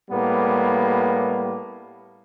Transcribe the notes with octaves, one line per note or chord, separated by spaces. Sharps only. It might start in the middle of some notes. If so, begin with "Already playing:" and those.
A2 G3 A#3 B3